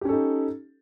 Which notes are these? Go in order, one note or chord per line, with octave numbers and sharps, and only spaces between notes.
C#4 D#4 G4 A4